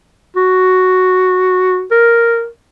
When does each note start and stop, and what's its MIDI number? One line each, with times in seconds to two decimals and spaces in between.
0.36 1.85 66
1.91 2.47 70